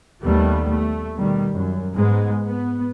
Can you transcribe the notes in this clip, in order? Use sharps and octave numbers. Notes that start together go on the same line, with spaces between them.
D#2 G3 A3 B3
A3
B2 D#3 G3
F#2
G#2 G#3 B3
B3